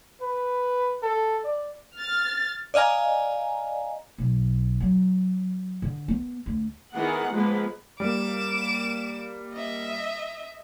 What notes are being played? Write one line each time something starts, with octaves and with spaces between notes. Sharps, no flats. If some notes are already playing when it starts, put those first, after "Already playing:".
B4
A4
D5
F6 A6
D5 D#5 F5 G#5 A#5
B1
F#3
D3
B3
D2
D#3 E3 B3 G#4 F#5
F3 G#3 A#3 B3 B4
G3 A#3 D6 E7
D#5 E5